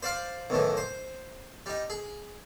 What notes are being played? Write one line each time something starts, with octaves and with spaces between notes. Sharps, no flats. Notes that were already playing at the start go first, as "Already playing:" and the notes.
C5 D5 F5 C6
B1 A2 D#3 E3
C5
G3 D#4
G#4